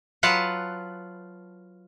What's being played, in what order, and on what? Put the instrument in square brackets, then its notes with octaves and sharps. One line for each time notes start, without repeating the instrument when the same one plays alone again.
[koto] F#3 F4 B4 F#5 A5